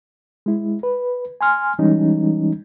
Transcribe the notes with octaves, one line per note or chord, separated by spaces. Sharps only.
G#3 E4
B4
G#5 C6 F6
E3 G3 G#3 C#4 D#4